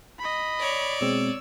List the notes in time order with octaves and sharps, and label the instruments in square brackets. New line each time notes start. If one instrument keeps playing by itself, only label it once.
[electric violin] D#5 B5
[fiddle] C#5 D5
[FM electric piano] B2 G#3 C4 [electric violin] E6